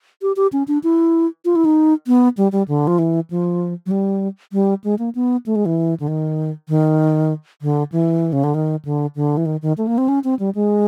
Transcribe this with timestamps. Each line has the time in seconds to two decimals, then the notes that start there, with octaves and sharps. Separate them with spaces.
0.22 G4
0.36 G4
0.53 C#4
0.68 D4
0.84 E4
1.45 F4
1.56 E4
1.65 D#4
2.07 B3
2.37 G3
2.52 G3
2.68 D3
2.87 F3
2.99 E3
3.30 F3
3.86 F#3
3.91 G3
4.53 G3
4.84 G#3
4.99 A#3
5.15 B3
5.46 A3
5.56 G#3
5.66 E3
6.00 D3
6.08 D#3
6.68 D#3
7.62 D3
7.92 E3
8.33 C#3
8.44 D3
8.54 D#3
8.85 D3
9.15 D3
9.37 E3
9.46 D#3
9.62 D#3
9.78 A3
9.87 A#3
9.98 C4
10.09 C#4
10.24 C4
10.39 G3
10.55 G#3